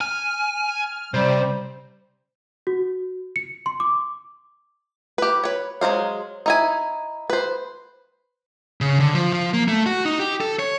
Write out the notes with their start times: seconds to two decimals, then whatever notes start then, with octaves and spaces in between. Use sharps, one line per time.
0.01 G#5 F6
1.14 C3 G3 C5
2.67 F#4
3.36 C#7
3.66 C6
3.80 D6
5.18 G4 B4
5.43 B4 C#5
5.81 F#3 G#3 D#4 C5 F5
6.46 D#4 E4 G#5
7.30 B4 C5
8.81 C#3
9.00 D3
9.14 F3
9.33 F3
9.53 A#3
9.68 A3
9.86 F#4
10.05 D#4
10.19 G4
10.41 A4
10.59 C#5